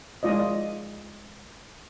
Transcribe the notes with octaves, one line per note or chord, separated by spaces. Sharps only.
G#3 F4 D5 D#5